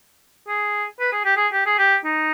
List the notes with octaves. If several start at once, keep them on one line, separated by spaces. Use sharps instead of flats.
G#4
B4
G#4
G4
G#4
G4
G#4
G4
D#4